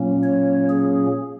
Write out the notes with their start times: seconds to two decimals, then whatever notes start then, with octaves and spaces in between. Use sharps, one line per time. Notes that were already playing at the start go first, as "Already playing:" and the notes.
Already playing: A#2 F#3 A#3 C#4
0.23 C#5
0.69 G#4